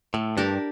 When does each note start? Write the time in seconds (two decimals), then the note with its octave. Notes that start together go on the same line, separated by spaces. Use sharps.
0.14 A2 A3
0.37 G2 D4 G4 A#4